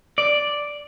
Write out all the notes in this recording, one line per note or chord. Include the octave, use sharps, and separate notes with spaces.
D5